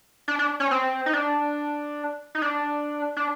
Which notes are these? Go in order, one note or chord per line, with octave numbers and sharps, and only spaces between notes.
D4
D4
C#4
C4
D#4
D4
D#4
D4
D4